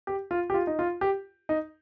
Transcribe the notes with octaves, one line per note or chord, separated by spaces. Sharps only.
G4
F4
G4
F4
D#4
F4
G4
D#4